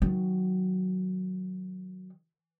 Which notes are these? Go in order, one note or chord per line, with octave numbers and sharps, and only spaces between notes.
D#3 F#3